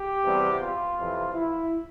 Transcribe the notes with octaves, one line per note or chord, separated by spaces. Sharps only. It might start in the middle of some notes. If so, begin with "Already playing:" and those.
Already playing: G4
E2 C3 G3 B3
F4
F2 C3 E3
E4